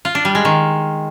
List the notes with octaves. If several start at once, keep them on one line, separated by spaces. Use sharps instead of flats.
F4
D4
G3
G#3
D#3